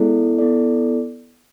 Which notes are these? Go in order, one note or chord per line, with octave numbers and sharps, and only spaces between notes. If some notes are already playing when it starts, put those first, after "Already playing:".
Already playing: G#3 B3 E4 A4 D5
B3 E4 A4 D5